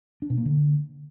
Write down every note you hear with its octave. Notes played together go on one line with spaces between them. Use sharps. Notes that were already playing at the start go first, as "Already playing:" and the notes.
D4
B2
A#3
D3